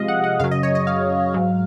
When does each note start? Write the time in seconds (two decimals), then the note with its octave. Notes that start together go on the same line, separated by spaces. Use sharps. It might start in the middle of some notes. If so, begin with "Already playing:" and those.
Already playing: C3 F3 G#3 D#5 F5
0.08 F#5
0.24 F#5
0.39 F#2 C#3 F#3 F5
0.51 D#5
0.63 C#5
0.75 D#5
0.87 F5
1.34 G#2 F#3